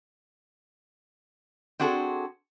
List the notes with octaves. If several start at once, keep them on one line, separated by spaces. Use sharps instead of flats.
C4 D4 F#4 G#4 A4